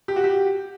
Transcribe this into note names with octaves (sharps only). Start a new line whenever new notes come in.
G4
F#4
G4